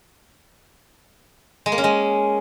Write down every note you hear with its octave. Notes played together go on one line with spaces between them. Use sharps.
G#3
A#3
C#4
G#3